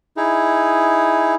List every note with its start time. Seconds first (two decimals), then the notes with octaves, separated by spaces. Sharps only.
0.17 D#4 E4 G#4